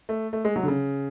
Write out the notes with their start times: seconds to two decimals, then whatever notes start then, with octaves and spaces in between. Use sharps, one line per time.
0.09 A3
0.33 A3
0.45 G#3
0.56 F#3
0.63 D3
0.68 C#3